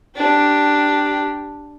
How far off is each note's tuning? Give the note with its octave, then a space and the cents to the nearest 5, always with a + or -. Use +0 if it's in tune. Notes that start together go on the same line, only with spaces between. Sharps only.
D4 +0 G4 -5